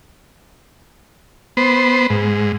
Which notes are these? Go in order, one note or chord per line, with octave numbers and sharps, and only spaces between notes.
B3 C5
G#2